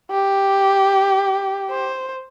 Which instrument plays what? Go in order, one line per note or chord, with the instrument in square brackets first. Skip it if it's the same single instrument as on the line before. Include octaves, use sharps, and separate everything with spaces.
[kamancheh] G4
C5